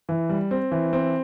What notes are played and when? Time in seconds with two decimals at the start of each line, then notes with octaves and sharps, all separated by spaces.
0.09 E3
0.29 G3
0.51 C4
0.72 E3
0.93 C4